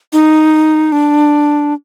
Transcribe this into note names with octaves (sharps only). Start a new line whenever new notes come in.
D#4
D4